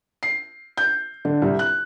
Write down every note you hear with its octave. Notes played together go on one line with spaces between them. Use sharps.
C7
G6
D3
C2
F#6